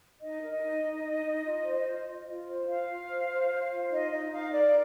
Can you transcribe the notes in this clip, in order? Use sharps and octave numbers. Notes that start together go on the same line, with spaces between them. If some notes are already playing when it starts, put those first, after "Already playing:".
D#4 D#5
A#4
D#5
D#4
D#4
D#4
D#4
F4
C5
F4
F4
F4
C5
F4 F5
F4
C5
C5
C5
F4
D#4 D#5
D#4 D#5
D#4 F5
A#4 D5